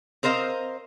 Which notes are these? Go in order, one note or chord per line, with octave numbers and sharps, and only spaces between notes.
C4 A#4 C5 D#5 F5